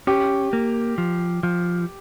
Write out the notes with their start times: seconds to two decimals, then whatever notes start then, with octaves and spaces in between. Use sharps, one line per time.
0.07 C#4 G4
0.53 A#3
0.98 F3
1.43 F3